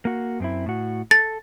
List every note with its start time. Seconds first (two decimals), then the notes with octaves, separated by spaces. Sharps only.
0.05 A#3 F#4
0.40 F#2 C4 E4
0.66 A2 F#4
1.11 A4 A6